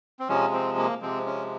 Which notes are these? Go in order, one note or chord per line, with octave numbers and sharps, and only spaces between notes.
C4
C3 F3 G#3 C#4
C4
A#3
C3 F3 G#3 C4
C#4